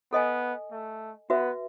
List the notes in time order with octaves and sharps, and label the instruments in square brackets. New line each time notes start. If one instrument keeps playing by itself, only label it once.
[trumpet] B3 [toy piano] A4 D#5 G#5
[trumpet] A3
[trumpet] B3 [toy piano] F#4 B4 E5